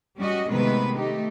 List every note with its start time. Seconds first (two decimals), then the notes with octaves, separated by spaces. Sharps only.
0.18 G3 C#4 F#4 D#5
0.49 C3 D#3 G#3 A3 B3 B4
0.98 A3 D#4 G4